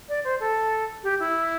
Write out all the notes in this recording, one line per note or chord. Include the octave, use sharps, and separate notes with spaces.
D5
C5
A4
G4
E4